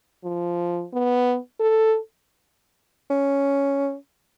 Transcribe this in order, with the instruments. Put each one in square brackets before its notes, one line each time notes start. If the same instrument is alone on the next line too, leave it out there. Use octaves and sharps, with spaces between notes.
[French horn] F3
B3
A4
[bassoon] C#4